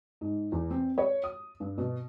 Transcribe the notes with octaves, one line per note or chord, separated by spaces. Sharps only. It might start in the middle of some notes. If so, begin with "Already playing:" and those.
G#2
E2
C4
C#5
D#6
G2
B2